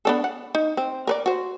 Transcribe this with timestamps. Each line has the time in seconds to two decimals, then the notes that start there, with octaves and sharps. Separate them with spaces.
0.05 B3 D4 A4
0.24 F#5
0.55 D#4
0.77 C4
1.07 A#4 B4 D5
1.26 F#4 C5